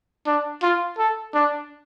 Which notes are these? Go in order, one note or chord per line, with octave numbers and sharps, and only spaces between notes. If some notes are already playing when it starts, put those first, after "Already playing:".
D4
F4
A4
D4